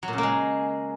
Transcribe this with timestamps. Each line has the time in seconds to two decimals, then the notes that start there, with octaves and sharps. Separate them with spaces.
0.03 F#3
0.08 A#2
0.13 C#3
0.18 A#3
0.23 G#3